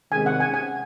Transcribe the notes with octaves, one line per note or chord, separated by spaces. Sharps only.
C3 D#3 G#3 C#4 G#4 G#5
F#5
G#5
G#5